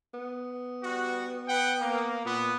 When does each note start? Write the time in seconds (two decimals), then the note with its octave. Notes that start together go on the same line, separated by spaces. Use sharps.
0.14 B3
0.83 G3 F#4
1.48 B4 F#5 G5
1.81 A#3
2.25 A#2 B3